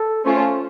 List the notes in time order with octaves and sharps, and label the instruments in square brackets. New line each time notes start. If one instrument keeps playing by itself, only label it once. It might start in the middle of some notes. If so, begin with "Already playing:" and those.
Already playing: [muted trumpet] A4
[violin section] A3 C#4 F4 [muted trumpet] C5